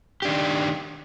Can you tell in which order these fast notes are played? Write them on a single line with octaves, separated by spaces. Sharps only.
G4 D4 D#3